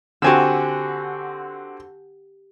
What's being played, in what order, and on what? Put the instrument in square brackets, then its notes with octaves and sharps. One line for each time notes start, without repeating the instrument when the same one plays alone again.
[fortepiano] D3 C4 F#4 [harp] G4 G#5 E6